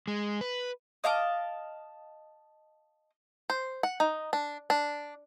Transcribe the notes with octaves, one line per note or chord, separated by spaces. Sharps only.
G#3
B4
D#5 F5 A5 D6
C5
F#5
D#4
D4
D4